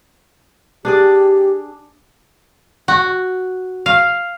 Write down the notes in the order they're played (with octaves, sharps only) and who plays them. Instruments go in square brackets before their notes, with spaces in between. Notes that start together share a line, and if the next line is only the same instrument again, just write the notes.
[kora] D4 G#4 D5 [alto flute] G4
[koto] F#4
F5